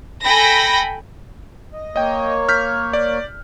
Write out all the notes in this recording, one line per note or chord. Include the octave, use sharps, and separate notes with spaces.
A4 G5 G#5 B5 A#6
D#5
A#3 C#5 D#5 G5
F6 G6 B6
D5